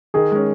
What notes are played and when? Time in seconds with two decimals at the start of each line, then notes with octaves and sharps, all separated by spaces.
0.14 D#3 G#4
0.32 G#3 C#4